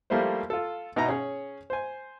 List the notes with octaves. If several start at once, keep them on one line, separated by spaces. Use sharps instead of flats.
F3 G3 A3 A#3 E4 C5
F4 A4
B2 D#4 E4 A#5
C#4 G#4 C#5
C5 G#5